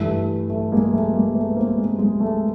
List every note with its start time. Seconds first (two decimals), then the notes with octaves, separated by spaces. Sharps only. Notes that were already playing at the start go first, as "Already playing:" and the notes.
Already playing: G2 E3 A3
0.50 A3
0.72 G#3 A#3
0.93 A3
1.13 G#3 A#3
1.35 A3 B3
1.56 A#3 C4
1.77 G#3
1.99 G#3
2.20 A3